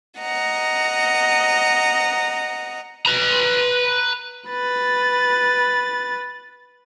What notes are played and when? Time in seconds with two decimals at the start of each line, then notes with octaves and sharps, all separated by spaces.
0.20 D#5 F#5 A#5
3.06 B4 A#5
4.49 B4 A6